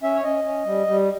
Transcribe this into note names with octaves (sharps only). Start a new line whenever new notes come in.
C#4 E5
C#5
C#4 D#5
C#4
G3
G3